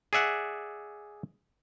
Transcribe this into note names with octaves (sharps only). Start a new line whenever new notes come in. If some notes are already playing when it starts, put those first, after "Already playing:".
G#4 D5 E5 F#5